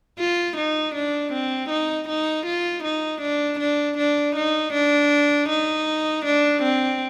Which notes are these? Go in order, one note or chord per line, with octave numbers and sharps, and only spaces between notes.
F4
D#4
D4
C4
D#4
D#4
F4
D#4
D4
D4
D4
D#4
D4
D#4
D4
C4